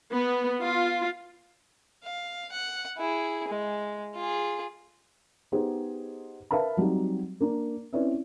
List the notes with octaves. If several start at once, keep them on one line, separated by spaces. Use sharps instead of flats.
B3
F4
F5
F#5
E4 G#4
G#3
F4 G#4
B3 D#4 G4 G#4 C5
A#4 B4 E5 F5 A5 B5
F#3 G3 C4 D#4 G4
A#3 D4
C4 C#4 E4 B4 D5 E5